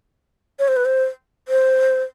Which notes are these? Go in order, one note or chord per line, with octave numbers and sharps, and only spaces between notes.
C#5
C5
B4
C5
C5